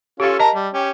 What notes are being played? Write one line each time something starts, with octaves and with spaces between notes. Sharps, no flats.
C#4 F4 G4 A4 F5
A#4 D#5 A5 A#5
G3
C#4 G4